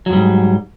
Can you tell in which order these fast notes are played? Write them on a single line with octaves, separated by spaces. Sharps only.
F#3 F2 G3 G#2